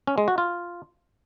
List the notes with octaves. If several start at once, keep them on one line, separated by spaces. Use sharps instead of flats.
C#4
G#3
F#4
F4